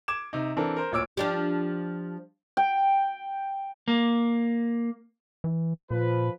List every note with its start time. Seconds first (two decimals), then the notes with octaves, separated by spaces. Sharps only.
0.08 D6 G#6 E7
0.33 C3 D#4
0.57 E3 C4 D4 A4 A#4
0.77 A#4 C5
0.92 D1 A#2 C#5 D6 E6 D7
1.17 F3 D4 G4
2.57 G5
3.88 A#3
5.44 E3
5.91 A#2 F3 B4